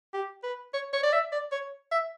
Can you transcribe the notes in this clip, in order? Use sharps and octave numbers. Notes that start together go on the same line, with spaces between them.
G4
B4
C#5
C#5
D5
E5
D5
C#5
E5